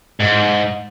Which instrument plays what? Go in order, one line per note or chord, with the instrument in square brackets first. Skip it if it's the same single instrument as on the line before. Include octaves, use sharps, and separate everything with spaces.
[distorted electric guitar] G#2